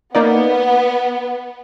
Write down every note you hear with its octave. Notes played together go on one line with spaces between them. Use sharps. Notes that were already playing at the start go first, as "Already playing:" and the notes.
A#3 B3 D#4 D5